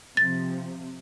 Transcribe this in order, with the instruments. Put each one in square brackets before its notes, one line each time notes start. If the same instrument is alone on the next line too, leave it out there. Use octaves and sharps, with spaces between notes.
[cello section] C3 F3 [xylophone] A6